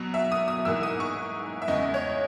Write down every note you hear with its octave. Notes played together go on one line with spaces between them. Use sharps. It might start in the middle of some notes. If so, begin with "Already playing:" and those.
Already playing: B2 F#3
E5
D#6
D#6
G#2 E3 A#3 E6
D#6
C#6
E5
E2 C#3 G#3 D#5
C#5